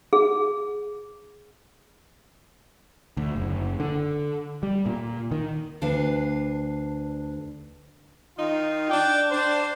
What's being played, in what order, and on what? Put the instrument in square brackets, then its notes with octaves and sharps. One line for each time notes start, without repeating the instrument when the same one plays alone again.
[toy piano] G#4
[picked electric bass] D2
F#1
D3
G3
A#2
D#3
[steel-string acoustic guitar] D2 D4 B4 F5
[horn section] D#3 D#4 F4
D4 D5 G5
D4 C5